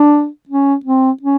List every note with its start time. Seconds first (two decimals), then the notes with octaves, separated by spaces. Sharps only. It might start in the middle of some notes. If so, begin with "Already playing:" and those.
Already playing: D4
0.49 C#4
0.85 C4
1.22 C#4